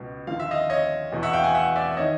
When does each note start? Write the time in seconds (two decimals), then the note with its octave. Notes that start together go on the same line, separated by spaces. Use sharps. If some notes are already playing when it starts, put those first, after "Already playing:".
Already playing: C#2 B2
0.27 D#2 D3 F3 F5
0.40 E5
0.51 D#5 F5
0.70 C#5 D#5
1.12 E2 B2
1.23 E5 F#5
1.33 F5 G5
1.44 F#5 G#5
1.55 E5 F#5
1.76 D5 E5
1.91 E5
1.97 D#3 C#5 D#5